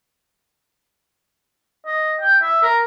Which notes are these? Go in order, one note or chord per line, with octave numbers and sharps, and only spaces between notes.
D#5
G5
E5
A#4